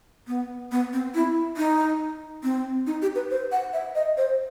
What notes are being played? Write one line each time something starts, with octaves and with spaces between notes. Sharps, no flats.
B3
B3
C4
E4
D#4
C4
D#4
G4
B4
C5
F#5
E5
D#5
C5